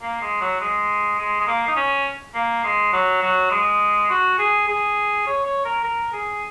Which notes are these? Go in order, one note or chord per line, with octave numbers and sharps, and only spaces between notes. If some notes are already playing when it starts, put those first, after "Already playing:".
A#3
G#3
F#3
G#3
G#3
G#3
A#3
D#4
C#4
A#3
G#3
F#3
F#3
G#3
F#4
G#4
G#4
C#5
C#5
A#4
A#4
G#4